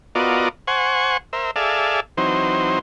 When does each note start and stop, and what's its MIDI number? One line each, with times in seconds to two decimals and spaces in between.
0.15 0.49 59
0.15 0.49 65
0.15 0.49 66
0.15 0.49 70
0.15 0.49 74
0.15 0.49 75
0.67 1.17 72
0.67 1.17 78
0.67 1.17 80
0.67 1.17 85
1.33 1.51 70
1.33 1.51 72
1.33 1.51 76
1.56 2.00 68
1.56 2.00 69
1.56 2.00 74
1.56 2.00 76
1.56 2.00 77
2.17 2.79 52
2.17 2.79 54
2.17 2.79 60
2.17 2.79 63
2.17 2.79 72